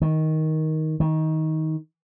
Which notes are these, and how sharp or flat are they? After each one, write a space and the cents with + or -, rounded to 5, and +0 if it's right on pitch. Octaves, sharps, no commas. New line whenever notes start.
D#3 +10
D#3 +20